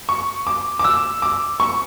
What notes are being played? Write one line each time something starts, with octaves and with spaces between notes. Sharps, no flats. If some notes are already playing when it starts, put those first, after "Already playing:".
C#6
D6
D6
E6
D6
C#6